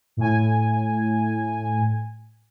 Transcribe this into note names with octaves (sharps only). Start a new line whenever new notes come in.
A2 G#5